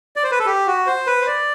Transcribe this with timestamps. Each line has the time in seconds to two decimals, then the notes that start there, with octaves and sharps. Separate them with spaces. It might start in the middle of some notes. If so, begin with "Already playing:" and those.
0.16 D5
0.24 C5
0.32 B4
0.39 A4
0.46 G4
0.67 F#4
0.87 C5
1.07 B4
1.22 C5
1.27 D5